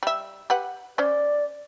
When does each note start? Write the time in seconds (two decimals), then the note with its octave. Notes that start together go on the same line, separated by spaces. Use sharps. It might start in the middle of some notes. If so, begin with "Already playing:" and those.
0.03 G3 E5
0.50 G4 B4 F#5
0.98 C#4 C5 D5